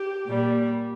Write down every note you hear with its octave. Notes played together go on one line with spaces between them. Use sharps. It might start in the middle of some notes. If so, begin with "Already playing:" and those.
Already playing: G4
A#2 G3